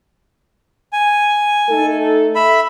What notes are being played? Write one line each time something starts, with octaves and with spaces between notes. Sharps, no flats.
G#5
A3 D#4 A4
E5 B5